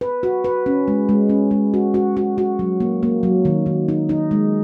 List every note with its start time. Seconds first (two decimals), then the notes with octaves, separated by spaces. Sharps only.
0.01 B4
0.23 F#4
0.44 B4
0.66 C#4
0.88 G#3
1.09 G#3
1.29 C#4
1.51 G#3
1.74 F#4
1.94 F#4
2.17 F#4
2.38 F#4
2.59 F#3
2.80 A#3
3.03 A#3
3.23 F#3
3.45 D#3
3.66 D#3
3.89 D#4
4.09 D#4
4.31 G#3